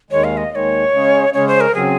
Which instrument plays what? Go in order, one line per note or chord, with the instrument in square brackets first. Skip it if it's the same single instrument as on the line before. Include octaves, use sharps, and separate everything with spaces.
[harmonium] D#2 D#3 G#3 [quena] C#5
[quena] F5
D#5
[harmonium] D#2 D#3 G#3 [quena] C#5 D#5
[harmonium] C#3 G#3 C#4 G#4
[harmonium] C#3 G#3 C#4 G#4 [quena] C#5
[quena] C5
A#4
[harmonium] C#3 F#3 C4 [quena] G#4